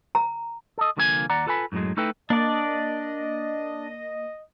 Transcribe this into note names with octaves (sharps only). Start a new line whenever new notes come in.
A#5
A4 D#5
C2 D3 F3 A#3 G4 G#5
D#2 D5 F#5 A#5
F4 A4 B4 G#5 B5
F#2 A2 C#3 F#3 G#3
A3 D#4 E4 A4 B4 G5
A#3 D4 D5 D#5